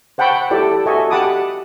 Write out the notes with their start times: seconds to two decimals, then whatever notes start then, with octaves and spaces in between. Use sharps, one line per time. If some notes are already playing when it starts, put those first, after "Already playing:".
0.18 C5 F#5 G5 A5 B5 C#6
0.51 E4 G4 A4 D5
0.86 F#4 A4 D#5 E5 G#5 C#6
1.10 G4 F#5 A5 B5 D6 D#6